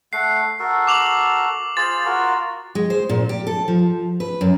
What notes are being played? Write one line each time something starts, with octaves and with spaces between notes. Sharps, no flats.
A3 F#5 C7
F#4 A4 A#4
D6 F7 F#7
F4 G#4 C5 A6
F4 F#4 A#4
G#3
C5
A#2
G4
A4
F3
B4
F#2